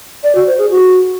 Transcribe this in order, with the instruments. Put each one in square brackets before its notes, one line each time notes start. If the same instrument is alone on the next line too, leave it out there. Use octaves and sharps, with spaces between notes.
[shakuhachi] D5
F#4
C5
G#4
F#4